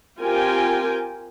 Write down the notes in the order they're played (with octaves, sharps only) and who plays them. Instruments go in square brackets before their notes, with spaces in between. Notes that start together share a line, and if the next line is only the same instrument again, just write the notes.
[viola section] C4 F4 G4 A#4 G5 G#5